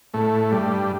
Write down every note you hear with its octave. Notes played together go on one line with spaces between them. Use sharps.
A2 A3
G2 G3